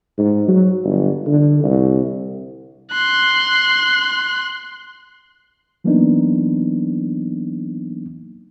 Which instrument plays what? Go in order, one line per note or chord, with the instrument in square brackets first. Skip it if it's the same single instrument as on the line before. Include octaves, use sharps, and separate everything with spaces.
[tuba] G#2
F#3
G1
D3
C2
[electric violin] C6 F#6
[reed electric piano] E3 F#3 A#3 B3 D4 D#4